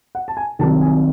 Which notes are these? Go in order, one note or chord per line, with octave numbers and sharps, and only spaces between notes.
F#5
A5
G#5
C2 C3 D#3 F#3 A5
G#5